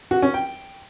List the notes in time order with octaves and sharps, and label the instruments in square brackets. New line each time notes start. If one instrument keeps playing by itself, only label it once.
[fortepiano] F#4
C#4
G5